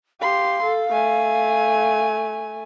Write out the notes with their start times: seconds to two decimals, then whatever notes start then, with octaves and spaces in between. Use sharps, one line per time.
0.21 G4 F5 C6
0.63 A4
0.93 A3 G#5